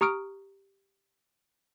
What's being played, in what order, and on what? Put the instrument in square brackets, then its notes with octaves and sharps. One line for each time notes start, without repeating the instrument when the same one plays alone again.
[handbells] G4 A#5 C#6 D#6 F6 D7